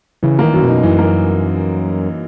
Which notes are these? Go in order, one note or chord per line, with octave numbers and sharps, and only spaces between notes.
C#3 E3
D#3 A#3
F#2
B2
D#4
F#2 E3
A#3